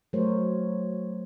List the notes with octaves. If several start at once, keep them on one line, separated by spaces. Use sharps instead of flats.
F#3 A3 A#4 C5 C#5